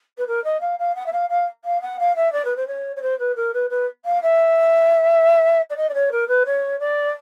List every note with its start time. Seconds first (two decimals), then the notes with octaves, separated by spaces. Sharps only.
0.18 B4
0.27 A#4
0.44 D#5
0.60 F5
0.79 F5
0.95 F#5
1.06 E5
1.12 F5
1.29 F5
1.64 F5
1.81 F#5
1.99 F5
2.16 E5
2.32 D5
2.44 B4
2.56 C5
2.67 C#5
2.96 C#5
3.01 C5
3.19 B4
3.35 A#4
3.53 B4
3.70 B4
4.05 F5
4.22 E5
5.70 D5
5.76 D#5
5.89 D5
5.94 C#5
6.11 A#4
6.28 B4
6.45 C#5
6.79 D5